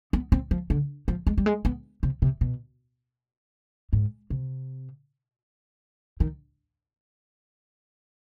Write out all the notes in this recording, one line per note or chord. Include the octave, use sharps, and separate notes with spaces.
B3
C4
F3
D3
F3
G#3
G3
G#3
B3
C3
C3
B2
G#2
C3
D#3